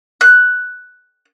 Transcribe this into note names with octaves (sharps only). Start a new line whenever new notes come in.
F#6